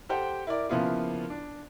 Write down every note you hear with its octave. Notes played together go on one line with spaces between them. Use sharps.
G4 A4 C5 F#5 G5
E4 A#4 D5
C#3 F3 A#3 B3 E4 F4
D4